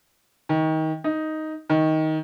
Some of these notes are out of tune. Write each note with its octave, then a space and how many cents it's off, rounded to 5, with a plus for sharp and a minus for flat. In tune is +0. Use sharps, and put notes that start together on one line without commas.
D#3 +25
D#4 +5
D#3 +15